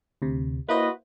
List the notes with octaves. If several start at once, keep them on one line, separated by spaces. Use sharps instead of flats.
D2 C3
A#3 E4 F#4 B4 C5 D#5